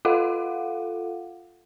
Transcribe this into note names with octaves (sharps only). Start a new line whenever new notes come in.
F4 A4 F5 F#5